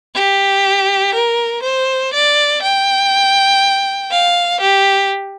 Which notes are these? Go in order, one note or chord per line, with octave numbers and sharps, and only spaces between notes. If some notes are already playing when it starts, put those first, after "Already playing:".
G4
A#4
C5
D5
G5
F5
G4